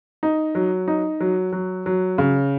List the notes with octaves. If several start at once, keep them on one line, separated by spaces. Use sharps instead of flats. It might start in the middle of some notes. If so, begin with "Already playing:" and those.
D#4
F#3
D#4
F#3
F#3
F#3
C#3